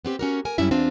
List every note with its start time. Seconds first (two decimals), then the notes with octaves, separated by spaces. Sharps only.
0.05 B3 C4 G4
0.19 C#4 F#4 A#4
0.45 A#4 G#5
0.58 F#2 G3 C#4 E4 E5
0.71 E2 C4 D4 F4 G4